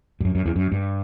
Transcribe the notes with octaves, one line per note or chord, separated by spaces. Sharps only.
G2
F#2
F#2
E2
F#2
G2